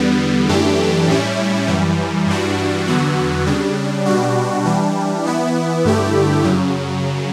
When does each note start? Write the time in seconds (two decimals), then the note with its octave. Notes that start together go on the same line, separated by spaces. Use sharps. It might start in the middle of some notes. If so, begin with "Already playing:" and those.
Already playing: E2 D3 G3 B3
0.49 F#2 E3 A3 D4 G4
1.08 A2 G3 C#4 E4
1.67 F#2 E3 G3
2.27 G2 E3 G3 D4 F#4
2.87 E2 D3 F#3 B3 F#4
3.46 C#3 G3 D4
4.06 B2 G3 D4 F#4
4.65 E3 G3 D4
5.24 E3 B3 E4
5.85 G2 D3 A3 E4 G4
6.44 F#2 C#3 F#3